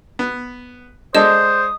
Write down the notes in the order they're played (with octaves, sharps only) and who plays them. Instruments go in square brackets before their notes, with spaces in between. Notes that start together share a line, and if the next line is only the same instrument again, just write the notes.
[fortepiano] B3
[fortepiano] G#3 D4 A4 [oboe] C5 [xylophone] D#5 E7 [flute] D#6